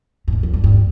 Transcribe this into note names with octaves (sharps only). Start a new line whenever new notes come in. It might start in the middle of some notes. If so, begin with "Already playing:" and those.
G2
G#2
F2
G2
G2